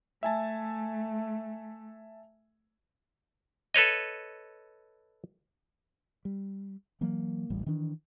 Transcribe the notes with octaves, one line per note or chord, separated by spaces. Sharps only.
A3 E5 G#5 A5
A4 B4 C#5 D#5
G3
E3 F#3 A#3
D1 A1 G3
D#3 E3 D4